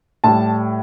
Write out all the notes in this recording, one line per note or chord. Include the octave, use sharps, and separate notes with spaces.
A2 G3 A5